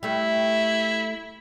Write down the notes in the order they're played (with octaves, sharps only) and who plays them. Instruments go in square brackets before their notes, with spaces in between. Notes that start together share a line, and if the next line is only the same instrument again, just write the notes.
[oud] G3 A3 [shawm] E4